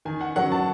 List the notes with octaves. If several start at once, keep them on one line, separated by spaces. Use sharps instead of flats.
D#3 G#5
F#5
F#3 C#4 F#5
A5